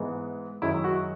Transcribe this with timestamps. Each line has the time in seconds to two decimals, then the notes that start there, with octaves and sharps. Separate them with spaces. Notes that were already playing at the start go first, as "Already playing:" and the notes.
Already playing: G#2 E3 G#3 B3
0.62 F#2 D#3 G#3 C#4 E4
0.84 F#4